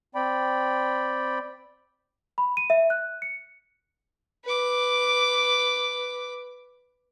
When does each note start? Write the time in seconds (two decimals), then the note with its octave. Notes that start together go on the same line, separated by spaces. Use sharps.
0.15 C4 D5 G5 B5
2.38 B5
2.57 D#7
2.70 E5
2.90 F#6
3.22 C#7
4.44 B4 D6